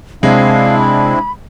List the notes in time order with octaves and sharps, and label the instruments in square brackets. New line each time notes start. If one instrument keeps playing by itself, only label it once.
[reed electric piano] C3 [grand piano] G#3 [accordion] C4 D4 E4 [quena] F5
[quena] B5